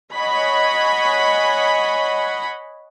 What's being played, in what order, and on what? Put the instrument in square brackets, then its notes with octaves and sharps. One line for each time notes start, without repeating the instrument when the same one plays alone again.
[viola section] C#5 D#5 F#5 G#5 B5